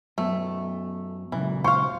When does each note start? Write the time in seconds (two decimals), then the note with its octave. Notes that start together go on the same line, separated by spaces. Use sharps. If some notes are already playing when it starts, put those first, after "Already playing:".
0.18 F#2 F#3 A3 B3
1.32 A#2 C#3 E3 F#3
1.64 C5 F5 C#6